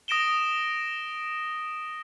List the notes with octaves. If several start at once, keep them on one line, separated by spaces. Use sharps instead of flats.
D#6 A#6 D7 E7 G7